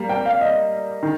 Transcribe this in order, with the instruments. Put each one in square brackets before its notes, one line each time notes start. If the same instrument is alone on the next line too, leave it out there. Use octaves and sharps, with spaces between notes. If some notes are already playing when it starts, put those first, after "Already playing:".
Already playing: [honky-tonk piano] G3 A#3
[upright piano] G5
F5
D#5
[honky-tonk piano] D#3